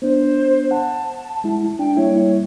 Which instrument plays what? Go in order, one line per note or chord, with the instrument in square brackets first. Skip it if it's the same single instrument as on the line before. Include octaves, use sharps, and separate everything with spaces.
[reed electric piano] B3 D4 [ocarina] C5
[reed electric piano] F#5 [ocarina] A5
[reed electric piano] G#3 E4
[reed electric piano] D4 [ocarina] G5
[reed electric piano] G3 A#3 E4 [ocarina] C#5